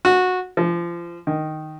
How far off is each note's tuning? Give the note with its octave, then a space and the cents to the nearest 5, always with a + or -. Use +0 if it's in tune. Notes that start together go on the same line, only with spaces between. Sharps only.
F#4 -15
F3 -30
D#3 -5